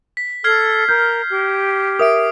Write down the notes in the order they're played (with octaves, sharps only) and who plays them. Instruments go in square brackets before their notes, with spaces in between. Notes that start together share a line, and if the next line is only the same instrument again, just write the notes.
[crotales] B6
[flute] A4 [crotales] F6 G#6 C7
[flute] A#4 [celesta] G6
[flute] G4
[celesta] A#4 E5 [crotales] D#6 D7